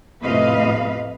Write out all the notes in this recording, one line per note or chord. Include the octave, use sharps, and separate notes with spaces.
F2 A2 C3 B4 D#5 F5